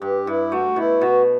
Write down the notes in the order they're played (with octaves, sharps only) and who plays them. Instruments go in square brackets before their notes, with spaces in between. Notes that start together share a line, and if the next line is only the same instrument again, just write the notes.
[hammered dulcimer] G2 [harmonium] G4
[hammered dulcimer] G2 [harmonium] E4
[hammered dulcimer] A3 [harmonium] F#4
[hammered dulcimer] B2 [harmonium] E4
[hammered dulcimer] B2 [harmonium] F#4